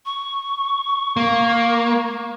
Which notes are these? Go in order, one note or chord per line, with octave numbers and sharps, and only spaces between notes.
C#6
A#3